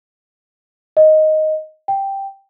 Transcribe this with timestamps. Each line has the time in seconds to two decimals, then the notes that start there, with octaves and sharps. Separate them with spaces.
0.97 D#5
1.88 G5